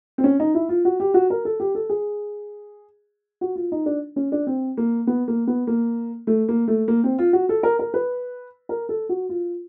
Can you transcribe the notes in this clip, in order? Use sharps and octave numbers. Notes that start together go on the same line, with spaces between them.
C4
C#4
D#4
E4
F4
F#4
G4
F#4
A#4
A4
G4
A4
G#4
F#4
F4
D#4
D4
C#4
D4
C4
A#3
B3
A#3
B3
A#3
A3
A#3
A3
A#3
C4
F4
F#4
A4
A#4
A#4
B4
A#4
A4
F#4
F4